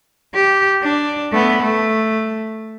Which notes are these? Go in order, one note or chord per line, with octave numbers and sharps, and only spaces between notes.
G4
D4
A3 B3
A3